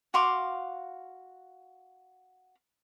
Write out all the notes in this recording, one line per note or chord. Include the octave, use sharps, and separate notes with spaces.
F#4 F5 C6 D6